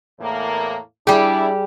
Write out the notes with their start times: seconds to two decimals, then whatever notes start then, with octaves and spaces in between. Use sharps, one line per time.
0.20 E2 A2 A#3
1.07 G3 D4 E4 G4 G#4